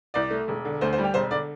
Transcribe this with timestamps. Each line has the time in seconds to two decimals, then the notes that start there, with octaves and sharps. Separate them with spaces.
0.14 C2 D5
0.31 A3
0.48 E1
0.65 D3
0.81 D2 C5
0.93 C5
0.98 G3
1.04 G4
1.14 E1 C5
1.31 D3 D5